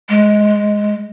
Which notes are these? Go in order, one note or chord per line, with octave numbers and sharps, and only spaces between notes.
G#3